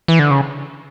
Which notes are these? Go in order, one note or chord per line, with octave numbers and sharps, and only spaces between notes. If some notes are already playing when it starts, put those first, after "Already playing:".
E3
D3
C#3